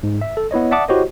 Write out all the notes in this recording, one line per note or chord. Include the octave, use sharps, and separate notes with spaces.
G#2
E5
A4
B3 E4 C#5 D#5
D5 E5 F#5 A5 D6 D#6
E4 F#4 G4 C5 C#5 D#5